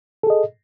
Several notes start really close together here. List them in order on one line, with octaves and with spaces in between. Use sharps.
A4 G#4 D#5